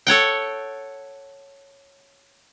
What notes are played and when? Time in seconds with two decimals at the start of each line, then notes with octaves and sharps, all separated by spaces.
0.07 A4 C#5 F#5 G5